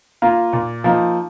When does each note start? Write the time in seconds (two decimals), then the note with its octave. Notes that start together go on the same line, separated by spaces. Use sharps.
0.22 A#3 F4
0.53 A#2
0.84 F3 A#3 D#4